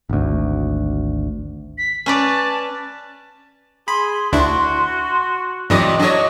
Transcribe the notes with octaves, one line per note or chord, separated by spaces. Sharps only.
G#1 D2
B6
C#4 B4 D5 A5
G#4 B5 C6
D2 D4 E4 F#4
G2 C3 E3 F#3 G3 D5 D#5
F#3 D4 C#5 D#5